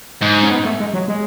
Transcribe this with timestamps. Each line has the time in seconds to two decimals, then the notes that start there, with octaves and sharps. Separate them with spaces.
0.22 G#2
0.43 C#4
0.51 B3
0.65 A3
0.80 G#3
0.94 F#3
1.08 G#3